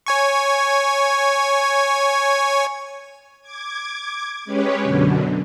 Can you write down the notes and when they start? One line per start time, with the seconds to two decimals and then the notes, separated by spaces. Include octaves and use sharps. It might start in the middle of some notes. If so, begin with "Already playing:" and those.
0.06 C#5 G#5 C#6
3.42 D6 G#6
4.45 G#3 C#4 G4 B4 C#5
4.82 F#2 B2 D3